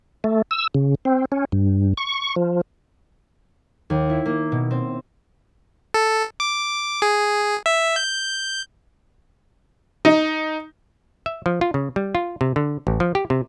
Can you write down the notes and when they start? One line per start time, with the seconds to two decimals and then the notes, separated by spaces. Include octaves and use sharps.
0.24 A3
0.51 E6
0.75 C#3
1.05 C4
1.32 C#4
1.52 G2
1.97 C#6
2.36 F3
3.90 D#2
4.09 E4
4.25 A#3
4.52 B2
4.71 C4
5.94 A4
6.40 D6
7.02 G#4
7.66 E5
7.96 G6
10.05 D#4
11.26 E5
11.46 F3
11.61 F4
11.74 C#3
11.96 G3
12.15 F4
12.41 C3
12.56 D3
12.87 A1
13.00 F3
13.15 G4
13.30 C3